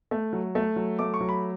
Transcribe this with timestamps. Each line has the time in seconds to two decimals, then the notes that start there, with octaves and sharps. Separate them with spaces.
0.11 A3
0.33 F#3
0.55 A3
0.76 F#3
0.99 A3 D6
1.14 C#6
1.21 F#3
1.29 B5